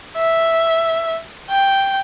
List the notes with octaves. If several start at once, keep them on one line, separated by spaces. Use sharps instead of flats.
E5
G5